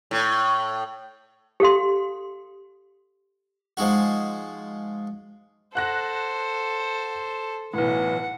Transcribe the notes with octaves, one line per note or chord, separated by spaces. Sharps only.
A2
G4 A4 F5 C6
F3 G#3 D#4 F#4
A4 C5 F#5 F#6 A#6
B1 A2 E3 F#5